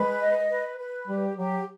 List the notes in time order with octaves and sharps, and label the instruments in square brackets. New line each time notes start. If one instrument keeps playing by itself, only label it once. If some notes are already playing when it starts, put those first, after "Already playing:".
Already playing: [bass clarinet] G#3 [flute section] B4
[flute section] D#5
B4
B4
[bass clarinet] G3 [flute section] G4
[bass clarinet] F#3 [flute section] G4